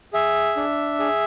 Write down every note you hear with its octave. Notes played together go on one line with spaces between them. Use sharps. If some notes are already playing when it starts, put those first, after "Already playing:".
G#4 E5
D4
G#4